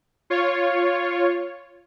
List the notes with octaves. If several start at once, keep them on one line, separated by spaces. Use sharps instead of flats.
F4 C#5